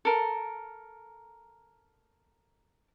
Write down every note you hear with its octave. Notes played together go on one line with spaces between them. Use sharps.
A4 A#4